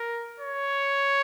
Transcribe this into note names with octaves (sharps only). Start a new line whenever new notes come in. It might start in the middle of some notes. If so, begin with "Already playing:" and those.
Already playing: A#4
C#5